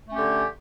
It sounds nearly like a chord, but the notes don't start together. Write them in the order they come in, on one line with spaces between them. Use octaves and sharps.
A3 C#4 G4 D3